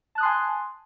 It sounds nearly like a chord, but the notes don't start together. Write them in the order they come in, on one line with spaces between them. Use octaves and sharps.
A5 F#6 D#6 C6 G#5